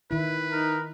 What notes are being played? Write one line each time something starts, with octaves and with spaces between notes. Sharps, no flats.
D#3 E4 B4
D#4 A#4